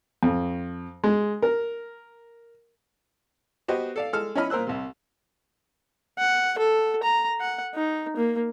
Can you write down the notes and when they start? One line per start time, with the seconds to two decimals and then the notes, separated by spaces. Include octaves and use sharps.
0.23 F2
1.04 G#3
1.42 A#4
3.68 B3 F#4 G4 B4 C5 D#5
3.96 A4 D5 F5
4.13 G#3 A4 F6
4.35 C#4 E4 C#5 D#5 B5 F6
4.50 A#2 A#4 C5 E6 F#6
4.67 C2 C3
6.18 F#5
6.59 A4
7.03 A#5
7.40 F#5
7.75 D#4
8.17 A#3